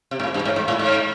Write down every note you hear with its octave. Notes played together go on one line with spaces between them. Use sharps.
C3
G#2
A2
G2
G#2
G#2
A2
G#2